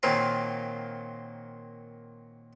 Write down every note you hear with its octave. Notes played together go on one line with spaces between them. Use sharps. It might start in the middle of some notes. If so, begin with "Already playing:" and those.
A#2 D#3 F#3 A#3 C4 F4